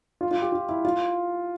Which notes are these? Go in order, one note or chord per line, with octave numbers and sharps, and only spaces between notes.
F4
F4
G4
F4
E4
F4